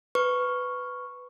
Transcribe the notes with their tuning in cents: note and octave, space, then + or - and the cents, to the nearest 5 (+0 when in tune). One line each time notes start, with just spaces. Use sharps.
B4 +10 C#6 +0